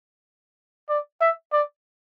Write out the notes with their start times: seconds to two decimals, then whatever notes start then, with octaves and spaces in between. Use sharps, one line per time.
0.89 D5
1.21 E5
1.53 D5